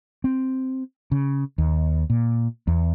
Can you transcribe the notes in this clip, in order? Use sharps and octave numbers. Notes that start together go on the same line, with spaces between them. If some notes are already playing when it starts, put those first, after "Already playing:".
C4
C#3
D#2
A#2
E2